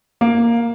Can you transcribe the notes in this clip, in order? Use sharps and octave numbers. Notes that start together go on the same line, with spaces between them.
A#3